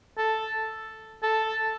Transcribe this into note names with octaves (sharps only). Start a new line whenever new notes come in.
A4
A4